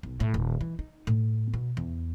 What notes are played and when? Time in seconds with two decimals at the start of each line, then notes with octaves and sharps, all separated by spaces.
0.03 B1
0.20 A2
0.34 D#1
0.61 E3
0.79 D#4
1.07 A2
1.54 B2
1.77 E2